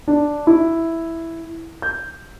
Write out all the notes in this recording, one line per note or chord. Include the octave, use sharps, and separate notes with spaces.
D4
E4
G6